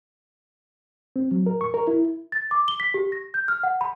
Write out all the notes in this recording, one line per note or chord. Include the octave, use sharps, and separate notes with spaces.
C4
F#3
A#4
C#6
A#4
E4
A6
D6
G7
B6
G4
A#6
G6
F6
F#5
B5